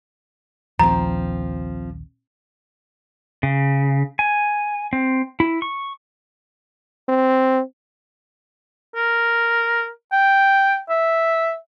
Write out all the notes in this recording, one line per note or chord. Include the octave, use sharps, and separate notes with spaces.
A#1 D#2 F3 C4 A#5
C#3
G#5
C4
E4
C#6
C4
A#4
G5
E5